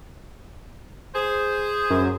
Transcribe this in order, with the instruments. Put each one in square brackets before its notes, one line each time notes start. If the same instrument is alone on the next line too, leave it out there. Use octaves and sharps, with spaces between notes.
[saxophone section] G#4 C5
[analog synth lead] F#2